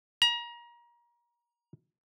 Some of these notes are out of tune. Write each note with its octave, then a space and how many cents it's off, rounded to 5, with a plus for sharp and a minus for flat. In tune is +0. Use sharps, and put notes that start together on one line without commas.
A#5 +30